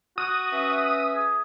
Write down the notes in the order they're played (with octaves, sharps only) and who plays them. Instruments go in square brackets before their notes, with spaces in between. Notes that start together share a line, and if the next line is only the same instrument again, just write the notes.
[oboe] F#4 [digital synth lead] D#6
[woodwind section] C#4 B4 E5
[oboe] G#4